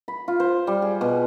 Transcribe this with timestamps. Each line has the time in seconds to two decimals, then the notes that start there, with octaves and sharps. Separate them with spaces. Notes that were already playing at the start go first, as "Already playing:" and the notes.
0.08 B5
0.28 F4
0.40 C5
0.67 G3
0.82 G#4
1.01 B2